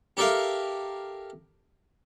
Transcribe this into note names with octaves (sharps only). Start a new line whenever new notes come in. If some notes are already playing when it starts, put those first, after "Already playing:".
G4 A4 A#4 E5 F5